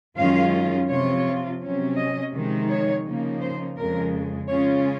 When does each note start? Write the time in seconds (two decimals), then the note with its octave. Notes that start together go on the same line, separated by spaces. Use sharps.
0.17 F#2 D#3 G#3 C#4 F4 F5
0.89 C3 F3 C4 F4 C#5
1.61 C3 F#3 C#4
1.96 D#5
2.32 F2 C3 D#3 G#3 D#4
2.69 C#5
3.05 C#3 F3 A#3 D#4
3.41 C5
3.77 F2 C#3 G#3 A#4
4.48 C#3 G#3 C#4 F4 C#5